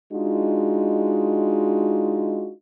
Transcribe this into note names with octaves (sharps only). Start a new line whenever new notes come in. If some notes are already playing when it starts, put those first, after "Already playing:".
G#3 D4 D#4 F4 F#4